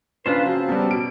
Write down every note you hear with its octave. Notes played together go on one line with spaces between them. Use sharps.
C#3 A#3 D4 F4 B4 C5
F#3 C4 A5
G3 B3 F#4 A#4
B2 D7